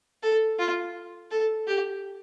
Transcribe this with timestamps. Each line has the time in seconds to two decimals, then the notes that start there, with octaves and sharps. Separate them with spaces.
0.23 A4
0.59 F4
1.31 A4
1.67 G4